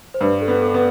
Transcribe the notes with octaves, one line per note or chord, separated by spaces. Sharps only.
C5
G2 B4
A4
B3
A4
B3